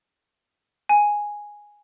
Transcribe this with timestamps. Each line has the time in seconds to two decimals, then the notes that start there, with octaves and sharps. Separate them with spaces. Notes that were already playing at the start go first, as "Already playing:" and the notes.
0.89 G#5